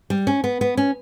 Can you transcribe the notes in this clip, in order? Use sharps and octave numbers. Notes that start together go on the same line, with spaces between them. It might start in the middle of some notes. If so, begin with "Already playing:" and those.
G3
C#4
B3
B3
C#4